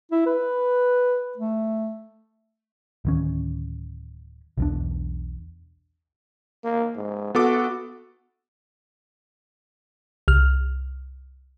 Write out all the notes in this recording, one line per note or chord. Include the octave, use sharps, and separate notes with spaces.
E4
B4
A3
D1 D#3 C#4
B1 E2 D4
A#3
G#2
B3 F#4 A4 D6
C2 F6